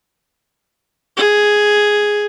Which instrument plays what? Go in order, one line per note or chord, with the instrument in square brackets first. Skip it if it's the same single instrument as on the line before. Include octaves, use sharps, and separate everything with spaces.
[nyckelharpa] G#4